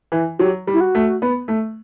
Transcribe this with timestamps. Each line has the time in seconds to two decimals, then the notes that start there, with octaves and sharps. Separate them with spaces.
0.12 E3
0.39 F#3 G4
0.67 G3
0.73 E4
0.80 F#4
0.95 A3
1.22 B3
1.48 A3